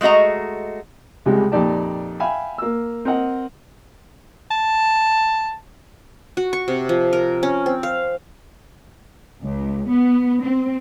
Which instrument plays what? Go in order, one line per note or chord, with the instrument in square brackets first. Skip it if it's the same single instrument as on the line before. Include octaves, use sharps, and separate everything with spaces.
[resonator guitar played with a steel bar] G#3 A3 F#4 D#5 A#5
[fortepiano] C#2 C3 G3 G#3
F2 A#2 D#4 G4 D5 A5
E5 F5 G5 G#5 B5
A#3 E6
C4 A#4 D#5 F#5
[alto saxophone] A5
[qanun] F#4
C#6
C3
F3
A#4
C#4
C4
F5
[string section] C#2
B3
C4